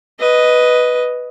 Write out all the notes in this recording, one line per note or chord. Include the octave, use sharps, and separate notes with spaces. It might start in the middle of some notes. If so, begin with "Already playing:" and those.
B4 D#5